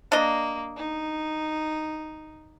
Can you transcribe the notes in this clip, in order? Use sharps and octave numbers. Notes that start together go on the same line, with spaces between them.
A#3 D4 D#5
D#4